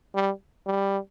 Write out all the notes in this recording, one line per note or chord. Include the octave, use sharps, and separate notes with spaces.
G3
G3